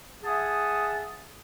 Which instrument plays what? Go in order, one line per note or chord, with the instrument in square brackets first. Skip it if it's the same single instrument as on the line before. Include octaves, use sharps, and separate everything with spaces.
[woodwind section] G#4 E5 F#5 G#5 A5 D#6